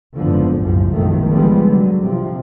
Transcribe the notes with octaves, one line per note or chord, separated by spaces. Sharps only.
F#1 G#2 D3 F3 B3
F#1 C2 F#2 A2 F3
F#1 B1 G#2 D#3 F3 A3
D3 F3 G3 G#3 B3
D3 F#3
C3 F3